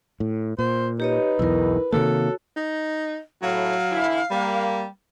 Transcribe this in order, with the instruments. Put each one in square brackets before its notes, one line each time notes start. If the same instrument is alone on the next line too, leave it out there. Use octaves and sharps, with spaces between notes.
[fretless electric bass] A2
[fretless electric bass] A#2 [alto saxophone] C5
[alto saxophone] D#4 [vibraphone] G4 C#5 D#5 [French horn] B4
[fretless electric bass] B1 E2 [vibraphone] E4 A#4
[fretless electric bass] C3 D#3 A#3 [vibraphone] F#4 C#5 [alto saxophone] A4
[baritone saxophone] D#4
[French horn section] A2 [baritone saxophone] F#3 [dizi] F5
[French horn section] D3 E3 E4
[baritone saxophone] G3 [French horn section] A#3